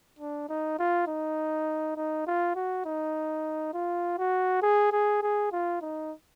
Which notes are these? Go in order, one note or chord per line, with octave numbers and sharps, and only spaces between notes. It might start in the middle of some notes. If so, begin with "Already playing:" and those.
D4
D#4
F4
D#4
D#4
F4
F#4
D#4
F4
F#4
G#4
G#4
G#4
F4
D#4